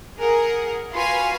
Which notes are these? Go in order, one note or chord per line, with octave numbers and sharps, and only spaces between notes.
G#4 A#4 F#5
F4 F#4 B4 F5 G#5 C6